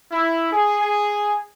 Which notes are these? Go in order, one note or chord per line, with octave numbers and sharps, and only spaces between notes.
E4
G#4